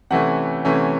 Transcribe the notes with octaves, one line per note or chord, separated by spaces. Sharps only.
C3 E3 A3 C#4 F#5
C3 E3 A3 C#4